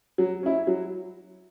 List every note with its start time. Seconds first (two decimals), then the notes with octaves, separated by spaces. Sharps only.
0.18 F#3
0.43 C#4 E4
0.67 F#3